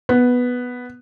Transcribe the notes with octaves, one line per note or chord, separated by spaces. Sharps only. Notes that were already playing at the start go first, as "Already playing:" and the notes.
B3